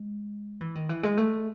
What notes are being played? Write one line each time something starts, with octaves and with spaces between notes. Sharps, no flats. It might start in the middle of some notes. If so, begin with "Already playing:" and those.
Already playing: G#3
E3
D#3
E3
G#3
A3